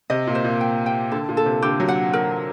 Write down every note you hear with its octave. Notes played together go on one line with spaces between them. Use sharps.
C3 D#5
A#2
C5
A#2
G5
G5
D3 A4
A#2
A4
C3
D3 G4
F#3
F#5
A#4